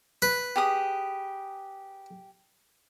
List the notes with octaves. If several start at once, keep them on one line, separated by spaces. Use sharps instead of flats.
B4
G4 G#4 D#6